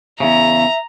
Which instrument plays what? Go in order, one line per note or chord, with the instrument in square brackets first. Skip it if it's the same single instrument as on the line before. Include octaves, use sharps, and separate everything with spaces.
[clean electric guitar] E2 C#3 [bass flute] E5 [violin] A#5